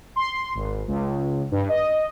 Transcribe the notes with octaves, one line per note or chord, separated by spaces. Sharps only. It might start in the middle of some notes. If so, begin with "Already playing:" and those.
C6
G#1
C#2
G2
D#5